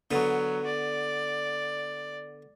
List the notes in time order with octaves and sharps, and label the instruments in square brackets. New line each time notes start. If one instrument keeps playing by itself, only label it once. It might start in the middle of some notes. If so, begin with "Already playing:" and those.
[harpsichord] D3 B3 [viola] F#3
[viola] D5